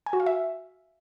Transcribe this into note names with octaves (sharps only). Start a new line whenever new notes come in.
G#5
F#4
F5
E5